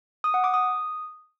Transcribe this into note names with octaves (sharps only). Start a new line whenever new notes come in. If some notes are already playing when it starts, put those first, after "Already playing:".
D#6
F#5
D6
D#6